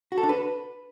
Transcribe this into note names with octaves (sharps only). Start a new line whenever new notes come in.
F#4
A4
D4
B4